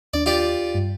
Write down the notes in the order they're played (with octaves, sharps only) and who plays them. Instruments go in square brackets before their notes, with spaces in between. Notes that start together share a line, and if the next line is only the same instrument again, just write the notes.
[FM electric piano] D#2 D4 [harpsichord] D5
[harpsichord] F4 G4 D5
[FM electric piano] G2